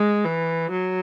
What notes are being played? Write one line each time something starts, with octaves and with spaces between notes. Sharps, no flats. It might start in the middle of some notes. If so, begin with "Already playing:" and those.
Already playing: G#3
E3
F#3